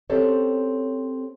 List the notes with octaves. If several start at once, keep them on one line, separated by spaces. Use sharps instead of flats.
C4 C#4 G4 A4 C5 C#5